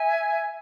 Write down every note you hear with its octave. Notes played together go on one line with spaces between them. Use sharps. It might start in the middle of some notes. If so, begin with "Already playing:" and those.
Already playing: E5 G#5